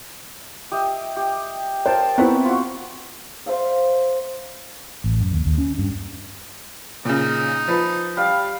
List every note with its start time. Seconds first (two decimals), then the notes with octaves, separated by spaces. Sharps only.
0.72 G4 D#5 E5
1.17 G4
1.86 A#4 C5 G5 A5
2.18 B3 C4 E4 A#5 B5 C#6
2.45 F4 F#4
3.46 C5 E5 F5
5.04 A1
5.21 F#2
5.33 D#2
5.46 D#2
5.58 C#4
5.78 G2
7.05 A#2 C#3 D#4
7.68 F3 B4
8.17 G3 F5